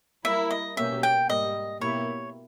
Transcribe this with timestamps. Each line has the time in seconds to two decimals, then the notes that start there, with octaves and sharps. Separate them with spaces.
0.25 G3 A#3 E4 A#4 E5
0.51 D#5
0.77 B2 A#3 C#4 G4 E5
1.03 G5
1.29 G#2 G3 A#3 D#5
1.81 B2 A#3 E4 G4 C#5